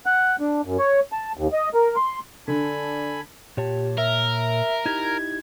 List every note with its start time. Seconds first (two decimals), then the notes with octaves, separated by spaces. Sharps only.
0.06 F#5
0.40 D4
0.65 F#2
0.79 C#5
1.12 A5
1.37 D#2
1.53 D#5
1.74 A#4
1.96 C6
2.48 D3 D4 A4 G#5 B5
3.57 A#2 G4 C#5 A5
3.98 A#4 E5
4.86 D#4 E4 G4 G#6